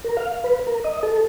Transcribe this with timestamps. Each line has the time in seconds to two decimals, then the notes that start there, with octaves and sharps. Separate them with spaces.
0.04 A#4
0.17 F5
0.44 B4
0.67 A#4
0.84 D#5
1.03 A4